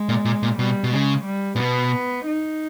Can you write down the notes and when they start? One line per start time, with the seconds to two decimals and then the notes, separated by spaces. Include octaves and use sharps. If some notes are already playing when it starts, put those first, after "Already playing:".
Already playing: G#3
0.09 A#2
0.25 A#2
0.43 A#2
0.59 B2 G3
0.84 B2
0.93 C#3 G#3
1.26 G3
1.56 A#2
1.60 B2 B3
2.27 D#4